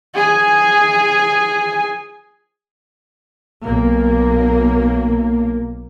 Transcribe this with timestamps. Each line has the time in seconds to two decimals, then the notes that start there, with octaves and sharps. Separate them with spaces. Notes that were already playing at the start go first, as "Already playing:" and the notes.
0.15 G#4 G#5
3.63 B1 A#3